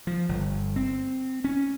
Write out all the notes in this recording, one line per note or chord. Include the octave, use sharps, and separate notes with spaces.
F3
G1
C4
C#4